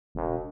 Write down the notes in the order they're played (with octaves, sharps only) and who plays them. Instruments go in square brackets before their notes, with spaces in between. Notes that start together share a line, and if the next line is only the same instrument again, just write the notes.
[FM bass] E1